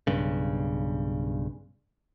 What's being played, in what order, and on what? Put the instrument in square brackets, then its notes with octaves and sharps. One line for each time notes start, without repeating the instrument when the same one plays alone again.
[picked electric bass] B1 G2 C#3